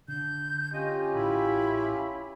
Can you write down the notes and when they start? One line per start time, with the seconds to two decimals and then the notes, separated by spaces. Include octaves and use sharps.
0.08 D3 G6
0.73 C#4 F4 G4 D#5
1.14 A1 E4 B5